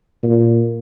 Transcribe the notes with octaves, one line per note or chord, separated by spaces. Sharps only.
A#2